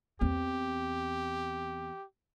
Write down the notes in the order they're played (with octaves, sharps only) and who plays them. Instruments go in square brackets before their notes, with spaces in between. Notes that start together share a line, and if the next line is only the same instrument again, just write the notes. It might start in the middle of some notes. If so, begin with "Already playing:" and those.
[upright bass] E2 C4 [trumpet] G4